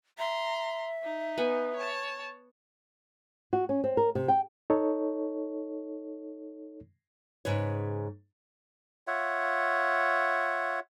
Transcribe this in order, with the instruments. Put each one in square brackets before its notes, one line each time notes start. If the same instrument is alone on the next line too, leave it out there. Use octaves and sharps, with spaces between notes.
[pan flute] E5 [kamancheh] A#5 C6
[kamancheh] D#4
[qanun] B3 G#5
[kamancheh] C#5 A5
[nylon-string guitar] F#4
C#4
C4
A#4
C3
G5
[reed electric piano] D#4 A4 C#5
[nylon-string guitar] G#2 C#3 B4 C#5
[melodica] F4 C#5 E5 F#5